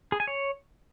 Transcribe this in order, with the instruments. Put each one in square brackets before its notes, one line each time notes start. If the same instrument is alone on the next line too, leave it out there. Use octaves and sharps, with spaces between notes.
[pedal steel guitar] G#4
G#5
C#5